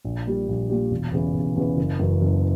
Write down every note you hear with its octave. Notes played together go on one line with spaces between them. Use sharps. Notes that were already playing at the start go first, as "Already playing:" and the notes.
A#1
A#2 G3
A#1
A#2 G3
E1
E2 C#3 E3
E1
E2 C#3 E3
F#1
F#2 E3
F#1